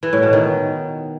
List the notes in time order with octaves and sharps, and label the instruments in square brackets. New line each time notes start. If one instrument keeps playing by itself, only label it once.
[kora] E3
A2
B2
D#3